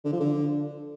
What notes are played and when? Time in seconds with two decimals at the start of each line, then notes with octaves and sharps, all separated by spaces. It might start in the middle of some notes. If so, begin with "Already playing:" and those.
0.05 D3
0.12 F3
0.20 D3